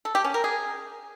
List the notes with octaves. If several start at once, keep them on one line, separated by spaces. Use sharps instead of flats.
A4
G4
C#4
A#4
G#4